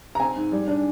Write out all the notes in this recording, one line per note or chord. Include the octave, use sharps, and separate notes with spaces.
A#5
C4 G#5
G#2
G3
D4